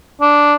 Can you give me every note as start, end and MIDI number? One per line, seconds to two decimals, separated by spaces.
0.21 0.55 62